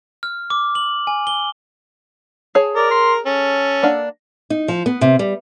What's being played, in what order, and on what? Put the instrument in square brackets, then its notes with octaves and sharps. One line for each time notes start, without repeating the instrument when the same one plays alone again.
[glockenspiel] F6
D6
F#7
G#5
G7
[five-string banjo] G#4 C#5 A5
[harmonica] A#4 [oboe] D5
[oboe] C6
[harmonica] C#4 [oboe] A4
[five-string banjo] A#3 D4 F#5
[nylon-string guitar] D#4
F3
B3
C3
G3